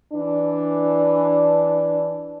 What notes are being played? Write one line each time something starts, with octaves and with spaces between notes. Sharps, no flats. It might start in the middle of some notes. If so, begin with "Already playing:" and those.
E3 D4